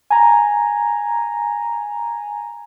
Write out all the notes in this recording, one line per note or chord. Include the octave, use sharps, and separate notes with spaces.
G#5 A#5